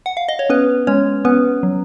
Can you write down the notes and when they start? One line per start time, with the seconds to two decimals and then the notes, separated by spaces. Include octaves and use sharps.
0.06 F#5
0.17 F5
0.29 D#5
0.39 C#5
0.49 B3 C#4 B4
0.87 G#3 C#4 C#5
1.25 B3 C#4 B4
1.63 F#3